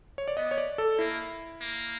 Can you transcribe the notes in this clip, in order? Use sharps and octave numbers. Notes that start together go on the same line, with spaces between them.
C#5
D5
B3 D#5
C#5
D5
A4
A#3 E4
A#3